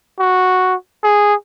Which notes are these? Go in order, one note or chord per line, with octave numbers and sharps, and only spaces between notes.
F#4
G#4